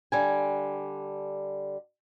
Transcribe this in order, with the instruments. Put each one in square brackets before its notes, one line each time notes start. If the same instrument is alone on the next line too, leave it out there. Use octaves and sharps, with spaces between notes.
[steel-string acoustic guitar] D3 G3 G#5